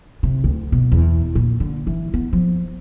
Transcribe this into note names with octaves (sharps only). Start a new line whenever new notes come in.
C3
D2
B2
E2
A#2
D3
E3
B3
F3